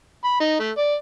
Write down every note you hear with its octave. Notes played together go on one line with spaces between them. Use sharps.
B5
D#4
A3
D5